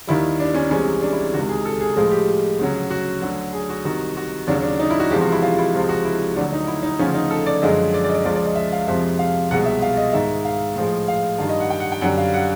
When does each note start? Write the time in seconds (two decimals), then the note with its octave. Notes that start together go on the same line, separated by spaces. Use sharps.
0.07 D#2 D#3 G3 E4
0.40 D4
0.55 C#4
0.70 C2 C3 E3 G#3 C#4
1.02 D4
1.12 E4
1.33 D#3 F#4
1.36 C#2 C3
1.49 G#4
1.65 A4
1.81 G#4
1.96 A2 F3 G#3 G#4
2.12 G4
2.59 D2 C#3 F#3
2.91 F#4
3.22 D2 D3 F#3
3.53 G#4
3.70 F#4
3.85 C2 C3 D#3 F#4
4.17 F#4
4.47 D#2 C#3 F#3 D4
4.63 D4
4.79 D#4
4.90 E4
5.00 F#4
5.11 E2 C3 F3 G#3 G4
5.21 F#4
5.32 E4
5.43 F4
5.58 E4
5.74 C#2 C3 F3 G#3 F4
5.89 F#4
6.05 E4
6.36 D2 D3 F#3 D4
6.53 D#4
6.67 E4
6.83 D#4
6.99 D2 C#3 F3 C#4
7.14 D#4
7.31 A4
7.46 D5
7.62 F#2 D3 F3 G#3 D#5
7.94 D5
8.04 D5
8.09 D#5
8.15 D5
8.25 C#2 C#3 F3 G#3 D5
8.36 D5
8.46 D#5
8.56 E5
8.72 F5
8.87 F2 C3 F3 G#3 E5
9.19 F5
9.51 C2 B2 G#3 F#5
9.66 E5
9.82 F5
9.97 D#5
10.13 G#2 D#3 G#3 E5
10.45 F5
10.76 A2 F3 G#3
11.08 F5
11.38 G2 D#3 G3 F5
11.49 D#5
11.60 F#5
11.70 G5
11.80 F#5
11.92 G5
12.01 F#2 D3 G3 F#5
12.18 F5
12.34 F#5